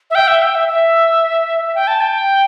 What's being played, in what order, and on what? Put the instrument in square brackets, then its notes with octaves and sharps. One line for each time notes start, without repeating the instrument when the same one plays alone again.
[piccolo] E5
G5
E5
G5
E5
E5
G5
A5
G5